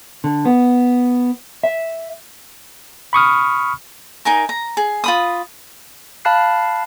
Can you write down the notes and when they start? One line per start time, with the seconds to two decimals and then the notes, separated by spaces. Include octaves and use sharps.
0.24 D3
0.45 B3
1.64 E5
3.13 B5 C#6 D#6 F6
4.25 D#4 A#4 G#5 A#5
4.49 A#5
4.77 G#4
5.04 F4 B5 D#6
6.25 F5 A5 B5 F#6 C7